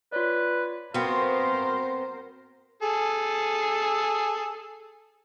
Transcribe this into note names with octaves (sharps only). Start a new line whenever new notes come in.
F4 B4 C#5 D5
B3 C4 F#4 A#4 C5 F5
G#4 A4